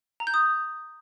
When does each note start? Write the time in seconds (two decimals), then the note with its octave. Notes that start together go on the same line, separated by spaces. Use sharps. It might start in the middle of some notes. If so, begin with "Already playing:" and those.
0.20 A#5
0.27 G6
0.34 D#6